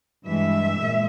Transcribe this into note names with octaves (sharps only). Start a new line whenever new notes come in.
G2 E3 G#3 E5
A#2 G#3